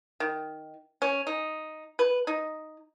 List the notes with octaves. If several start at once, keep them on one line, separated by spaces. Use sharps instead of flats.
D#3
C#4
D#4
B4
D#4